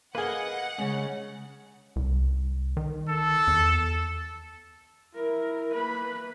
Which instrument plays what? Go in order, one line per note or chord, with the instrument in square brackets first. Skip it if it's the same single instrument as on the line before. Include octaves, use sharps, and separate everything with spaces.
[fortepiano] A#3 G#4 [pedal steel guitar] B4 D#5 [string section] F#5
[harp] C#3 G#3 [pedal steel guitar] C#4
[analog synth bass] C2
D#3
[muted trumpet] A4
[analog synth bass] E2
[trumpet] E4 [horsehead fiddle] A#4
[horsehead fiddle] A#3 B4 [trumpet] B5